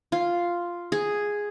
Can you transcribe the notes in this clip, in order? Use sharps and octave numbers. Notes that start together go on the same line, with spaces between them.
F4
G#4